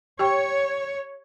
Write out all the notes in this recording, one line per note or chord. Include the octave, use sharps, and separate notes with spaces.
G4 C#5 G5 C#6